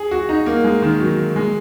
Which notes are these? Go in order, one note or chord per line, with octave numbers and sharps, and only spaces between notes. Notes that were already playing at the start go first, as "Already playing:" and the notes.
Already playing: G#4
F#4
D#4
A#3
G#3
D#3
F#3
G#3